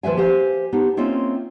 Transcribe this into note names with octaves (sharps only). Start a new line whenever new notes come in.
D#2 F3 B4 E5 G#5
G4 C5 F5 G#5
B3 D4 D#4 G4
A#3 C4 C#4 D#4 F4 E5